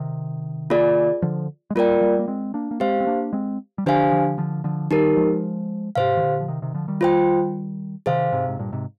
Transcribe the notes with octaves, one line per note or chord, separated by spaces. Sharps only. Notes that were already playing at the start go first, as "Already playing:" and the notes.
Already playing: C3 D#3
A#3 F4 G#4 D5
D3 F3
G#3
G3 A#3 F4 A#4 D5 G5
G3 A#3
A#3
G#3 C4
A#3 D4
A#3
G#3 C4 G4 C5 F5
C4
A#3 D4
G#3 C4
G3
D3 F3 D4 G4 C5 F5 G#5
D3 F3
D3 F3
D3 F3
D#3 G3 D#4 G4 A#4
F3 G#3
G#2 C3 G4 C5 F5
D#3
A#2 D3
F3
C3 D#3
C3 D#3
D3 F3
D#3 G3
F4 C5 G5
C3 D#3 G#4 C5 F5
G#2 C3
G#2
G2 A#2
G#2 C3